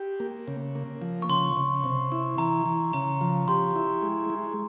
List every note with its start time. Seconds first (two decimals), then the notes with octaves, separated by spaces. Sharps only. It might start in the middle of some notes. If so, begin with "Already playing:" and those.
Already playing: G4
0.20 A#3
0.48 C#3
0.75 A#3
1.02 F3
1.22 C#6
1.29 C#3 C6
1.57 C#3
1.84 C3
2.12 E4
2.38 E3 A#5
2.66 E3
2.93 C#3 A#5
3.21 F3
3.48 G4 C6
3.76 E4
4.02 G#3
4.30 G#3